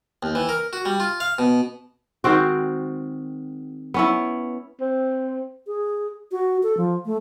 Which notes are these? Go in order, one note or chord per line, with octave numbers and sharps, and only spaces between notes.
D#2
E3
A#4
F#4
G3
F4
F5
B2
D#3 G#3 C4 F#4
B3 C#4 E4
C4
G#4
F#4
A4
F3
A3